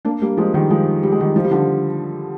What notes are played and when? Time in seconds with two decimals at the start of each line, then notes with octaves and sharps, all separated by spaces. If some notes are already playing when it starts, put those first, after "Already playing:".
0.05 A#3 D4
0.21 G3 A#3
0.37 F3 G#3
0.54 D#3 G3
0.70 F3 G#3
1.03 G3
1.12 G#3
1.20 D#3 G3
1.36 F3
1.44 G3
1.51 D3 F3